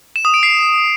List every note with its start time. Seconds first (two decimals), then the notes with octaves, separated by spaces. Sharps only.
0.16 E7
0.25 D#6
0.34 D7
0.43 C7